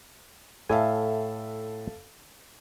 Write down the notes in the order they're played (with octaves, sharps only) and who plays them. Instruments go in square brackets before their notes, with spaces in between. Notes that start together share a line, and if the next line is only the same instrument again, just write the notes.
[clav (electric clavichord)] A2 G#5 [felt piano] A4 E5 F5